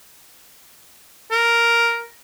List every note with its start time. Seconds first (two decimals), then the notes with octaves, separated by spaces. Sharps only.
1.31 A#4